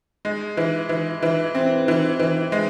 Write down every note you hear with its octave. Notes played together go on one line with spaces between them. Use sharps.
G#3
E3
E3
E3
C4
E3
E3
G#3